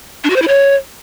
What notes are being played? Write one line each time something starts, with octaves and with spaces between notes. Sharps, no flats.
D4
F#4
C5
E4
C#5